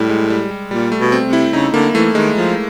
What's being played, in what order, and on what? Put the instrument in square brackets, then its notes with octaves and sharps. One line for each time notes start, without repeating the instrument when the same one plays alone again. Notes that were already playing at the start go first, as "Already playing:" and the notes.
Already playing: [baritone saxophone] A2 [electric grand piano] G3
[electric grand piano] G#3
G3
G3
[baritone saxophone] A#2 [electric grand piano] G3
[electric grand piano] A3
[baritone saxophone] B2
[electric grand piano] C4
[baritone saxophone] C3
[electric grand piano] E4
[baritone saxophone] C#3 [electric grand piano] D#4
[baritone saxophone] D3 [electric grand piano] A#3
[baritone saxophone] E3 [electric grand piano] A3
[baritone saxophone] D#3 [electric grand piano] G#3
[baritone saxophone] F3